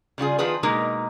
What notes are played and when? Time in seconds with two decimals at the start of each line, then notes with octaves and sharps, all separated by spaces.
0.18 C#3 G3 F4 G#4
0.39 D#3 F3 B3 F4 G#4 B4
0.63 B2 G#3 A#3 D#4 A#4